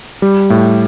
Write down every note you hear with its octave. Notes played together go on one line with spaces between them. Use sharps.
G3
A2